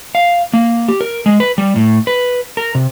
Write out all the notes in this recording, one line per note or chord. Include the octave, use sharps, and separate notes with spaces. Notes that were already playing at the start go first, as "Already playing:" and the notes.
F5
A#3
G4
A#4
G#3
B4
G3
A2
B4
A#4
C3